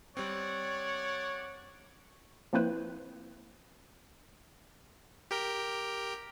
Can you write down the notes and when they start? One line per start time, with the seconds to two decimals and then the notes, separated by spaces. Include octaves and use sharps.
0.17 G3 C4 C#5 D5 F#5
2.53 F3 A#3 C4 E4 B4 C5
5.31 G4 A#4 G5